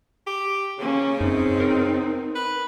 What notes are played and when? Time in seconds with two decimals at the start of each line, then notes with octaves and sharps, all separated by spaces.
0.27 G4
0.79 C#3 A#3 C#4
1.21 F#2 C4 D#4
1.60 A#4
2.35 B4